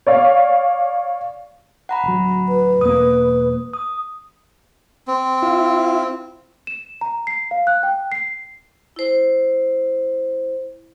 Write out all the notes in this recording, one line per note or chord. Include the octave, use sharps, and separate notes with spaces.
C#5 D5 F5
F#5 A#5 B5
D1 F#3
B4
E1 A#3 D#6
D#6
C4
E4 F4
E7
A#5
C7
F5
F#6
G5
C7
E4 C5